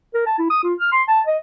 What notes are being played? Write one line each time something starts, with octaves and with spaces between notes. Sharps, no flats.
A#4
A5
E4
D#6
F4
F6
C6
A5
D#5